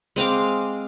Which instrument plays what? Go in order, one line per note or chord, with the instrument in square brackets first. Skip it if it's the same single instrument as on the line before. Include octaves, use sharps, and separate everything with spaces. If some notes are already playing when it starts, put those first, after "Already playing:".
[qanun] G#3 C4 F5 D6